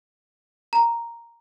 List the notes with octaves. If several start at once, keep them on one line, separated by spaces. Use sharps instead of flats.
A#5